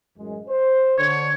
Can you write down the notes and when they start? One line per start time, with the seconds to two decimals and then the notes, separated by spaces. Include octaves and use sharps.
0.17 A1 F#2 G#3
0.47 C5
0.98 D3 C#5